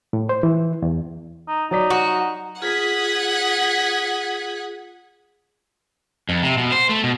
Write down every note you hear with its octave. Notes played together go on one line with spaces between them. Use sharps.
A2
C5
E3
E2
D#4
F#3 D#4 D5 B6
F#4
F4 G#4 F#5 D#6 G#6 B6
F2
C3
B2
C5
A3
B2